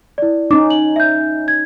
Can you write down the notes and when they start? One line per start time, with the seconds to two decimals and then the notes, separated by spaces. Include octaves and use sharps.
0.18 E4 D5
0.51 C#4 D#4 D6
0.71 F#7
0.96 E5 G6
1.48 G#6